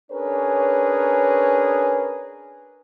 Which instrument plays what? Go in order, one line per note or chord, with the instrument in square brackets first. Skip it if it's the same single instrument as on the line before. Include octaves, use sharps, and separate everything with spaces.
[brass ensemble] C#4 D4 G#4 A#4 B4 C#5